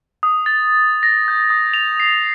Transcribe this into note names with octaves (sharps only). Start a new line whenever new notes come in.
D#6
A6
A#6
G6
D#6
F7
C7